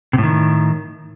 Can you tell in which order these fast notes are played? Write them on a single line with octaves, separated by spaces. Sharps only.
C3 A2 D#3